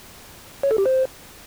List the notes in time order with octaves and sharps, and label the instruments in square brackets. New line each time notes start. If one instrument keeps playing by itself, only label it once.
[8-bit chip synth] C#5
A4
G4
C5